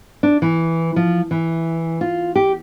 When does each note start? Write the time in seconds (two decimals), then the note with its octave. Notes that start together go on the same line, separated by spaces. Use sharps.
0.23 D4
0.42 E3
0.96 F3
1.31 E3
2.01 F4
2.36 G4